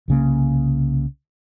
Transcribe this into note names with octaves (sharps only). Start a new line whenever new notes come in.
C2 C#3 A#3